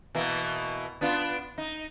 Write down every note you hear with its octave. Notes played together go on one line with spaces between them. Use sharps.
B2 E3 A#3
B3 D4 F4
D#4